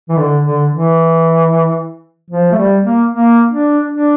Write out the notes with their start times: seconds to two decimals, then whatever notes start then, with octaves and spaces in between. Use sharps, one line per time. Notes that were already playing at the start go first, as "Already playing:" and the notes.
0.09 E3
0.18 D3
0.44 D3
0.70 E3
2.31 F3
2.52 A3
2.58 G3
2.83 A#3
3.11 A#3
3.51 D4
3.91 D4